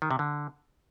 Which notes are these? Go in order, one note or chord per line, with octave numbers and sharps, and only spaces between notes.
D#3
C3
D3